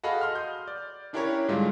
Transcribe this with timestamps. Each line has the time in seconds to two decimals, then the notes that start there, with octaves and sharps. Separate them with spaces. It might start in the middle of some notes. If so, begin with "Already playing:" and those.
0.04 F#4 G#4 A4 D#5 F5 B5
0.21 C6 F6
0.35 D#6 G6
0.67 D5
1.13 C#4 D4 E4 G4 A#4 C#5
1.48 G#2 D3 G3 G#3 F4